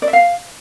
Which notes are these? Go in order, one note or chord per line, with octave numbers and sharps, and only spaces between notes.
D5
E5
F5